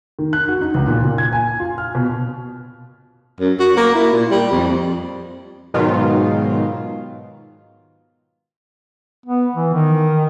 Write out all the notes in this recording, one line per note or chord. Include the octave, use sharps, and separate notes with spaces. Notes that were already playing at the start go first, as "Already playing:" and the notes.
D#3
F#6
F#4
D#4
C#2
A#2
A#2
G#6
G#5
F4
F6
B2
F#2
F#4
A#3
E4
A#2
G3
F2
G#2 B2 D#3 F#3 F4
B3
E3
D#3